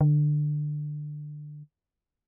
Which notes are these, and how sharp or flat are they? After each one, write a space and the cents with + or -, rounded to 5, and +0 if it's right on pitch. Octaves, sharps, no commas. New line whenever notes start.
D3 +20